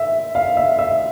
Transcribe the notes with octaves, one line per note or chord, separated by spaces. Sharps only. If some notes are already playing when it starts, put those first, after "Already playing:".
Already playing: E5
F5
E5
E5